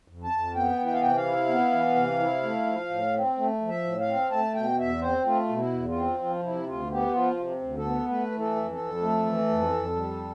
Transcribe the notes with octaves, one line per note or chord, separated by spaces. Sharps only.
F2
A5
F2
B3 G5
E3
G5
F5
C3 G5
F5
E4
B3
E3
C3
E4
A3
F3
A2
C4
A3
F3
E5
A2
F5
C4
A3 A5
B2 G5
E2 E5
C4 C5
A3 F4
B2
E4
E2
F4
C4
F3 F4
C3 E4
D2 F4
B3 G4
F3 F4
C3
D2
A4
B3
A3 B4
E3
A4
F2
A4
F2
A3
E3
F2
F2
G3